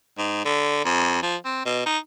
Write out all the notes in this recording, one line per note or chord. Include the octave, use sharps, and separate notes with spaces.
G#2
D3
F2
F3
C4
B2
D#4